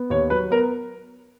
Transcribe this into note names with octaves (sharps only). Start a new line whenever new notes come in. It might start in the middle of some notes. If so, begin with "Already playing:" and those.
Already playing: B3
D#2 C#5
F#3 B4
B3 A#4